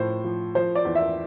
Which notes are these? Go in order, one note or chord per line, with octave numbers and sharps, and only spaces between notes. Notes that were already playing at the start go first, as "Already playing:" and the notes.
Already playing: A2 F3 C5
F3
F3 C5
D5
E2
E5